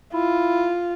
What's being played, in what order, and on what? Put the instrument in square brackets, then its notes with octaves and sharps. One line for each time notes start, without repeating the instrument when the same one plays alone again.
[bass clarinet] E4 [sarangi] F4